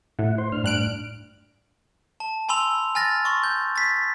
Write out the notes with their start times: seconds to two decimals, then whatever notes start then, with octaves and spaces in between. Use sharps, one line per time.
0.19 A2 E4 F#5
0.38 C5 C6
0.52 A2 D4 F6
0.64 G2 F#6 D7
2.20 A5
2.49 G#5 B5 C6 E6 F7
2.95 G#5 F6 A6 A#6
3.25 C6 C#6
3.43 G6
3.76 A6 B6